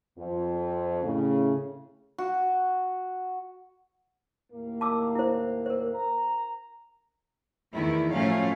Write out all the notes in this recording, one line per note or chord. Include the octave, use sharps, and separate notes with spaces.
F2
A2 C#3
F#4
D#2 A2 A#3
A5 D6 E6
E4 C5
A#4 C5
A#5
E2 D#3 E3 A3 E4
A2 F3 F#3 A3 C#4 F5